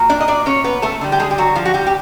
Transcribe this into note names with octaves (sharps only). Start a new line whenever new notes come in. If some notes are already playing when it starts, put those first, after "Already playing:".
Already playing: A#2 F#3
D4 D5
D#5
D4 D5
C#4 C#5
B3 B4
A3 A4
D3 G3
G4
G#3 G#4
G4
F#3 F#4
F3 F4
F#4
G3 G4
G4